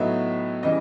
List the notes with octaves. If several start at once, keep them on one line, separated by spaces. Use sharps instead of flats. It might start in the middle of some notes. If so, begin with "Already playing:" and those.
Already playing: A2 F#3 B3 D#4 E5
C#3 E3 G3 D#5